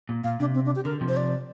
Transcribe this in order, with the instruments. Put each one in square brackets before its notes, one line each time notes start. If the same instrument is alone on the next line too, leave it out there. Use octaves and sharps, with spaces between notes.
[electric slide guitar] A#2
[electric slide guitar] A#2 [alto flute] F5
[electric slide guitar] C3 [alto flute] D4
[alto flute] C4
D4
G4
[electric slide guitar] D3 [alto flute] A#4
[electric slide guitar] C3 F3
[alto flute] C5
D5